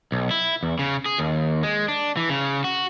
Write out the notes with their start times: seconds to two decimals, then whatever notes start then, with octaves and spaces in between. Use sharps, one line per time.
0.12 B1
0.31 E4
0.63 E2
0.79 C#3
1.06 G#4
1.18 D#2
1.63 G#3
1.88 D4
2.17 E3
2.29 C#3
2.64 F#4